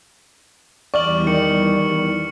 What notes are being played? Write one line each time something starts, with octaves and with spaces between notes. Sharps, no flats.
E2 E3 G3 D5 C#6 F6 F#7
D#3 C#7